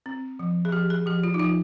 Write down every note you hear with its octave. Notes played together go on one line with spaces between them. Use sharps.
C4
F3
G#4
F3 G4
G#4
F3 G4
F4
D#4
F3 F4